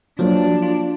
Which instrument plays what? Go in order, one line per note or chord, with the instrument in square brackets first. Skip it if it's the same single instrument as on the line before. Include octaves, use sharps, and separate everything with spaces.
[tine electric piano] F3 F#3 A#3 [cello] D4
[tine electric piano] F4